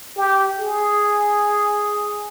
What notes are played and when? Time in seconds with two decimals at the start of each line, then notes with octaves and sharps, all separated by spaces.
0.17 G4
0.59 G#4